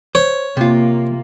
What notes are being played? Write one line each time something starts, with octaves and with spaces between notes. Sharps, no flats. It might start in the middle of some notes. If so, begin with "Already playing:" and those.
C5 C#5
C3 A#3 F4